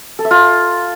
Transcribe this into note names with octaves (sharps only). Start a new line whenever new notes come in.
A4
E5
F4